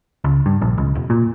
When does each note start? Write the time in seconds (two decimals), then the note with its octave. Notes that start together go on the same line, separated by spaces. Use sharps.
0.24 C#2
0.46 G2
0.62 A#1
0.78 C#2
0.95 E1
1.10 A#2